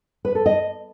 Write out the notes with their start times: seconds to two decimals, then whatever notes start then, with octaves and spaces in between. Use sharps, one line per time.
0.25 B4
0.35 A4
0.46 D#5